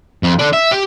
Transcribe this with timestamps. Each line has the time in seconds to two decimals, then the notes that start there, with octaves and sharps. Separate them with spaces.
0.23 F2
0.39 D3 D4
0.53 E5
0.71 G4